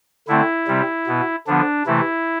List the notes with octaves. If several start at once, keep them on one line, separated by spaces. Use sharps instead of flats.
D3 A3 C4 E4
C3 G3 C4
B2 B3
D3 F3 B3 D4
C3 E3 A3 E4